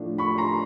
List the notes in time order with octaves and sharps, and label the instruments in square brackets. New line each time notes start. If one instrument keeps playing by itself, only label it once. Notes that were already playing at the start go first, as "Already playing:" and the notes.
Already playing: [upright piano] A2 F3 A3 D4
B5 C#6
A#5 C6